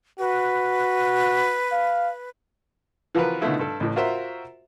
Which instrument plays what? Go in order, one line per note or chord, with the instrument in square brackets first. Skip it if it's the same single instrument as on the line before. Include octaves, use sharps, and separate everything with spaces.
[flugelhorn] F#4 [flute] B4
[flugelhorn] F5
[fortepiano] E3 F3 F4 F#4 A#4 B4
B2 D3 D#3 A3 E4 F4
G2 A4
A1 A2
F4 F#4 A#4 C5 E5